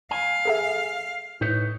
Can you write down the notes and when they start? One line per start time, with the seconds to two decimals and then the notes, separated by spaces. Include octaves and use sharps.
0.11 F5 G#5
0.45 G#4 A4 E5
1.41 A2 D#4 B4 C#5